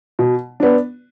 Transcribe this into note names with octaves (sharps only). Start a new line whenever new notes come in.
B2
B3 D4